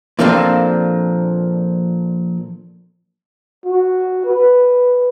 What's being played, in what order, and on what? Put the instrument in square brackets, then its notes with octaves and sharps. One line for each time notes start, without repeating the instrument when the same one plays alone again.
[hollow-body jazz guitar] A#2 F3 A#3 C4 D4 A4
[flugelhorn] F#4
B4